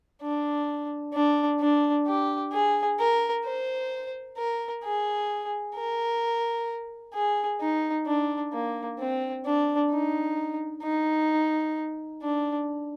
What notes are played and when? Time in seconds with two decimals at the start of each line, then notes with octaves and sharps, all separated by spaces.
0.22 D4
1.14 D4
1.60 D4
2.07 G4
2.53 G#4
2.99 A#4
3.45 C5
4.37 A#4
4.83 G#4
5.76 A#4
7.14 G#4
7.60 D#4
8.06 D4
8.53 A#3
8.99 C4
9.45 D4
9.91 D#4
10.83 D#4
12.22 D4